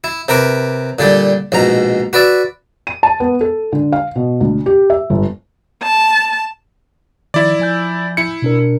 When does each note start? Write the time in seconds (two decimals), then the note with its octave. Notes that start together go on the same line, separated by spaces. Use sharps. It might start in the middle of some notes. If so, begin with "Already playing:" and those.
0.04 E4
0.29 C3 A#4 B4 D6
0.99 A#2 D3 G3 G4
1.52 A#1 G#2 B2 A#5
2.13 F#4 B4 D5 E5
2.87 D#7
3.03 A5
3.20 B3
3.41 A4
3.73 D3
3.93 F5
4.16 B2
4.41 D2
4.66 G4
4.90 E5
5.10 G1
5.83 A5
7.34 D#3 F3 E4 D5
7.60 F3 G#5 G6
8.17 E4 C#7
8.42 B2 D4 A#4